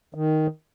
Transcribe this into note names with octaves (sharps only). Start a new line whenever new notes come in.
D#3